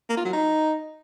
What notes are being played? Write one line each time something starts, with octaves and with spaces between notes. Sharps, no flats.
A#3
F4
F#3
D#4